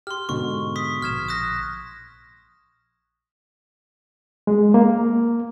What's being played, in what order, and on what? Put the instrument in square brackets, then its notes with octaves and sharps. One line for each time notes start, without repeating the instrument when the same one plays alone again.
[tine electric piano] G4 [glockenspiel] C6 F6
[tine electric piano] G#2 B2 D3 [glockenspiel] C#6
[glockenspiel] C#6 D#6 B6
[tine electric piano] A#1 [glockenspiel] F6 G#6 E7
[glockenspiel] D#6 F#6 A#6
[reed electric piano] G#3
A#3